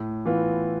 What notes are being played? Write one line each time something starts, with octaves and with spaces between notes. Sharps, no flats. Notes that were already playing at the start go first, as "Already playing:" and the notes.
Already playing: A2
E3 B3 F4